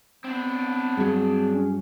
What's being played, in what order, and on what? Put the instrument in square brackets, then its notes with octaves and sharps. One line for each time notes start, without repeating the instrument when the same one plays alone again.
[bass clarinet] B3 [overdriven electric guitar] C4 D4
[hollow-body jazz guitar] G2 F#3 [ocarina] G#4
[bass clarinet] C#4